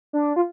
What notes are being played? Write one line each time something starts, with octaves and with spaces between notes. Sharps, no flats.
D4
F4